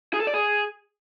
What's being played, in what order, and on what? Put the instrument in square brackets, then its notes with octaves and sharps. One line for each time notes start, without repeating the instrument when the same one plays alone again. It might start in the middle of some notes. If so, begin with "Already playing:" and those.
[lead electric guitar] G#4
A4
D5
G#4